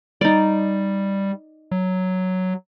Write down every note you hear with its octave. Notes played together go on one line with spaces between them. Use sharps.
G3 D#4 D5
F#3